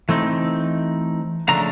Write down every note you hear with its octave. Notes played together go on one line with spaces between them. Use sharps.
E3 A3 C4 D#4
C#3 F3 A3 D4 A#5